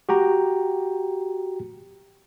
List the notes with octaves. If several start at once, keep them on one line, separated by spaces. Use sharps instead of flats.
F#4 G4 G5 A#5